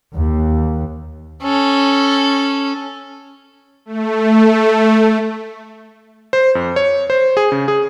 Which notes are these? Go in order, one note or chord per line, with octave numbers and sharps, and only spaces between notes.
D#2
C#4 A4
A3
C5
F2
C#5
C5
G#4
C#3
G#4